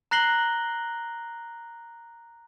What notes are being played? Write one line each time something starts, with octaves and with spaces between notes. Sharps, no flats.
A#5 F#6 A#6 C7 F#7 G7